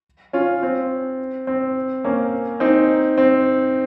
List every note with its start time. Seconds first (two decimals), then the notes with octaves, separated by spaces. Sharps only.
0.33 C#4 F4
0.63 C4
1.47 C4
2.04 A#3 C#4
2.60 C4 D#4
3.18 C4